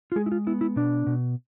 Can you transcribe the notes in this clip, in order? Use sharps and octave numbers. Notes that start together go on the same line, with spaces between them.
F4
G#3 G#4
E4
F4
B3 E4
E4
B2 D4
B2